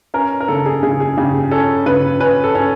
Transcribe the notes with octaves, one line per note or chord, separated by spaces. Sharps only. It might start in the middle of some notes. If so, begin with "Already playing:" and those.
C#4 A#4
A#4
C#3 A4
G#4
C#3 G#4
G#4
C#3 G4
G#4
C#4 A4
C#3 B4
C#4 B4
A4
C#4